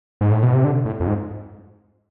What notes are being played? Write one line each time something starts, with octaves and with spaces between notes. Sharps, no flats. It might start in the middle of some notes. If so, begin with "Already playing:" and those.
G#2
A2
B2
C3
D3
A2
F2
G#2